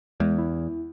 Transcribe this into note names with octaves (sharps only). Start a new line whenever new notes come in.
E2 G#3
E4